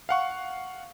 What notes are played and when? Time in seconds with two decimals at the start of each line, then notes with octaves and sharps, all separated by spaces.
0.09 F5 F#5 C#6